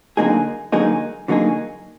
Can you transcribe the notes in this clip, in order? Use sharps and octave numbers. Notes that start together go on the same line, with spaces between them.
D3 F#3 A#3 D#4 G#4
D3 F#3 A#3 D#4 G#4
D3 F#3 A#3 D#4 G#4